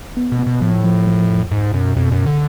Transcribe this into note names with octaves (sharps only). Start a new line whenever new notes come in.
B3
B2
B3
B2
A2 F3
F3
F3
F2
C#2 G#2
F#2 B2
F2 B2
F#2
C#2
D3